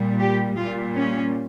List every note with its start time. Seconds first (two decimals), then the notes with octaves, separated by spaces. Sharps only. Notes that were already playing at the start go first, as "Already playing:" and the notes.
Already playing: A#2 G3
0.19 G4
0.57 A#2 G3 F4
0.94 C#4